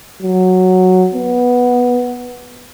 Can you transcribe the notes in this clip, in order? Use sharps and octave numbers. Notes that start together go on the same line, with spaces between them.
F#3
B3